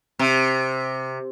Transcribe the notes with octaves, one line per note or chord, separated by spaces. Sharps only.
C3